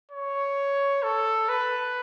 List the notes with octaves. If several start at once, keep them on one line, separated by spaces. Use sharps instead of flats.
C#5
A4
B4